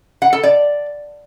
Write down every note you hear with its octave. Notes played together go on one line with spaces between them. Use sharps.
F#5
A4
D5